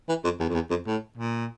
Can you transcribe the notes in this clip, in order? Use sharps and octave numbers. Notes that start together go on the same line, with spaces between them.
E3
F2
E2
F2
E2
F2
A2
A#2